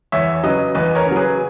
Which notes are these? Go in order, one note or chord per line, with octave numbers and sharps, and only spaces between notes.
E2 C#5 E5
C#3 F#3 B4 D#5
E2 B4 D#5
A#4 C#5
C#3 F#3
G#4 B4